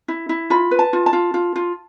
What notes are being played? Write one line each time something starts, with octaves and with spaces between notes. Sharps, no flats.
E4
E4
F4 B5
B4
A5
F4
A5
F4
F4
F4